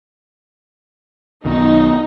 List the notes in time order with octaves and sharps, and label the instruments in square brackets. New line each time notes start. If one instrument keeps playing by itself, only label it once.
[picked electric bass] B1 B2 D#3 [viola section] D#4